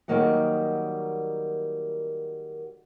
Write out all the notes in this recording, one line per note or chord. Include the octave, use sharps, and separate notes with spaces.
D#3 F#3 G3 A#3 D#5 F#5